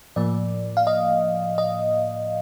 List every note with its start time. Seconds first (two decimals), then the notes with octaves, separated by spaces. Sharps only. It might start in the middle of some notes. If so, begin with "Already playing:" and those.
0.16 A2 F3 A#3 D5
0.77 F5
0.87 D#5
1.58 D#5